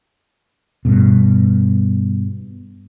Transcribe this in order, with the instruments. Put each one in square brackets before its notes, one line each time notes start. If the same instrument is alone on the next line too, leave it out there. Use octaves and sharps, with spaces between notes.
[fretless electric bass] G2 B2